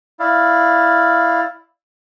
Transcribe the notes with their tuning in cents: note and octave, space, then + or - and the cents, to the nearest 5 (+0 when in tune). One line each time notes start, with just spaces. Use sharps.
E4 +0 D5 +0 F5 +0